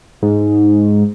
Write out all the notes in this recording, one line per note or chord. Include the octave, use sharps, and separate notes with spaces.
G#2